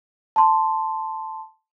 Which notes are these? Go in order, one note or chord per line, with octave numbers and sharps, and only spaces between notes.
A5 C6